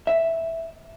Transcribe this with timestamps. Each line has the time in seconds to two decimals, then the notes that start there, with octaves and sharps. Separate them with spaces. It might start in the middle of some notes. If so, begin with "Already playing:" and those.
0.07 E5